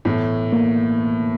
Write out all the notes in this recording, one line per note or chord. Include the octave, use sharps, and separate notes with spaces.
A2 E3 A3 B3
A#3